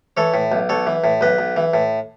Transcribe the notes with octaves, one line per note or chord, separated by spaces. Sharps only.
E3 A4 C#5
A2
B1
B1 A4 C#5
E3
A2
B1 B4 D#5
B1
E3
A2